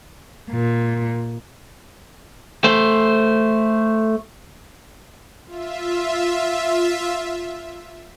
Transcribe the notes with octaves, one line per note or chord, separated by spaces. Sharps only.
A#2
A3 C5
F4 E5